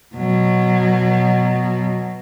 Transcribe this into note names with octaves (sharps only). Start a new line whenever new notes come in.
B2 F#3